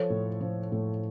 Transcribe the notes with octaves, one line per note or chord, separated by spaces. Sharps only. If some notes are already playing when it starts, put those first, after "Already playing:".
Already playing: F3 A4 C#5
A2
F3
A2